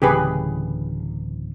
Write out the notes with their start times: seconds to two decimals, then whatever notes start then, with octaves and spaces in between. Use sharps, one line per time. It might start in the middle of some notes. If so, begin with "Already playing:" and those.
0.02 D1 C#3 E3 G4 G#4 B4